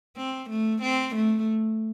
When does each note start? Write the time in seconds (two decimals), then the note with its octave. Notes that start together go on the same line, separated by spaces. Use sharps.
0.17 C4
0.50 A3
0.82 C4
1.15 A3